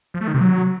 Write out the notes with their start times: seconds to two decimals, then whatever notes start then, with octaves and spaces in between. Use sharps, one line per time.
0.14 F3
0.21 A3
0.27 D#3
0.34 C3
0.41 F#3